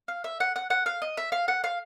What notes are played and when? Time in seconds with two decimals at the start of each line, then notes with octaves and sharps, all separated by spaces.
0.08 F5
0.24 E5
0.40 F#5
0.56 F#5
0.70 F#5
0.86 F5
1.02 D#5
1.17 E5
1.32 F5
1.48 F#5
1.64 F5